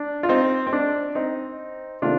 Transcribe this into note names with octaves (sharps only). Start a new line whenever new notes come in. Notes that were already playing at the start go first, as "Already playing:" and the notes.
Already playing: D4
F4
C4 D#4
C4
D4
C4 D#4
C3 D#3 A3 D4 F4